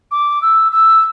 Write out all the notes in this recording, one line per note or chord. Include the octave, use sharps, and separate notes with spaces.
D6
E6
E6